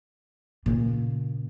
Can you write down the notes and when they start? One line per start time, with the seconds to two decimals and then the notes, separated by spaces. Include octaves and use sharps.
0.66 A#2 C#3